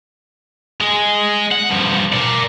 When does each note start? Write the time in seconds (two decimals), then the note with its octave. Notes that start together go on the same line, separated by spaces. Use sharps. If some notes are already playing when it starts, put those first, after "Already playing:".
0.81 G#3 G#4
1.51 F#5
1.70 G2 F3
2.13 A#4 D5